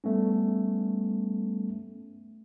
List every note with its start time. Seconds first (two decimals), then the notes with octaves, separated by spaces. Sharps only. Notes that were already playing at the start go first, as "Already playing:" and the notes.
0.04 G3 A3 B3 C#4